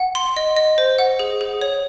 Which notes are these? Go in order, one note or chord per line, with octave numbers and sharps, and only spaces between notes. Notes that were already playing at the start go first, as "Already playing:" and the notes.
Already playing: F#5
C6
D#5
D#5
C5
F#5
G#4
G#4
C#5